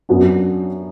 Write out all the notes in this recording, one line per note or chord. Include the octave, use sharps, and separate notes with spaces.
F#2 F#3 B3 D4